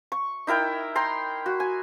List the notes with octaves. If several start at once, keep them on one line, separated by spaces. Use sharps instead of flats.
C#6
D#4 E4 A#4 G5
G5 A#5 C6
F#4
G#5